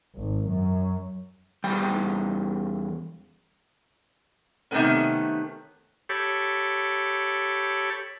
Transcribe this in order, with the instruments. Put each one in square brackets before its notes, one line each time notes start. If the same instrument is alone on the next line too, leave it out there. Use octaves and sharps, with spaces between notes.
[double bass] G#1
F#2
[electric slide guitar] E2 G3 G5
[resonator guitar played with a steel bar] C3 D#3 F3 A3 B3 C#4
[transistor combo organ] G4 A4 C#5 B5